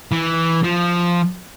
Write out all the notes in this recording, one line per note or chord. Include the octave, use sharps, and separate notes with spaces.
E3
F3